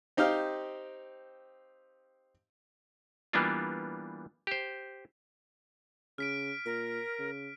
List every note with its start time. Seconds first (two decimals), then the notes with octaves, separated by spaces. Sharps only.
0.17 C4 D#4 G4 C5 F5
3.33 E3 G3 A#3 B3 D4 F4
4.47 G4 C5
6.18 C#3 F6 B6 D7
6.66 A#2 A#4
7.19 C#3